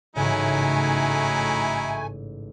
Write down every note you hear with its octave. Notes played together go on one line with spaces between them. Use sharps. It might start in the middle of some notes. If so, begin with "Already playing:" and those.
A1 G#2 C#3 F#3 A3 D#4 E4 G#5